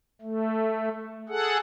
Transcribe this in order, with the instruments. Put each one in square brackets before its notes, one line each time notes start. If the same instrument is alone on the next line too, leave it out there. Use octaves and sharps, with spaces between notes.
[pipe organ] A3
G#4 A4 F#5